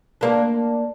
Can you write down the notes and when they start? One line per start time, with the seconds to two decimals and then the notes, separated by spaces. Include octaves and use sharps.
0.21 A#3 D4